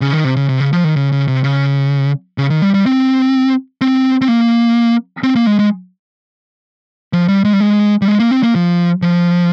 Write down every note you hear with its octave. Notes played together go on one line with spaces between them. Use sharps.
C#3
D#3
C3
C#3
C3
C#3
F3
D#3
C#3
C#3
C3
C#3
C#3
D#3
G3
G3
C4
C4
C4
A#3
C4
A#3
G#3
G#3
F3
G3
G#3
G3
G#3
G3
G#3
A#3
C4
A#3
F3
F3